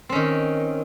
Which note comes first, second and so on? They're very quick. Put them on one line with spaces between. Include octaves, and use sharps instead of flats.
C4 C#4 D#3